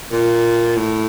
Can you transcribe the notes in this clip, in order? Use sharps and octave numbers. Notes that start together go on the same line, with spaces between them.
A#2
A2